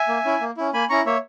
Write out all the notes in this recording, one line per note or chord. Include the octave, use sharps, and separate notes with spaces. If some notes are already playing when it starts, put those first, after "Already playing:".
Already playing: E5 G#5
A#3
C#4 E4
A#3
C#4 E4
A#3 G#5 B5
C#4 E4 A#5 C#6
A#3 C#5 E5